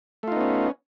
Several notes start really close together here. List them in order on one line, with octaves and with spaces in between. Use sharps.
A3 F4 D#4 B3 C#4